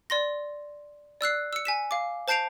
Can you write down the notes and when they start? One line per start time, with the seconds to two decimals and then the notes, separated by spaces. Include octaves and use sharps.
0.10 D5 C6 A#6
1.21 D5 E6 F#6 C7
1.53 E6 C#7
1.65 G#5 B6 E7
1.91 F5 D6
2.28 C5 A5 G6 C7 D7 F7